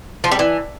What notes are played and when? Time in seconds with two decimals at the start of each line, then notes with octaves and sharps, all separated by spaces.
0.24 F3
0.31 G3
0.39 E3